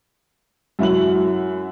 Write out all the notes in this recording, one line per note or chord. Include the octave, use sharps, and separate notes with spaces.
F#2 E4 F#4 F#7